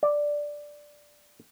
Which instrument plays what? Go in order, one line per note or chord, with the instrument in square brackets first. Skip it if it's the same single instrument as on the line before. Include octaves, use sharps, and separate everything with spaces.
[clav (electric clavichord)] D5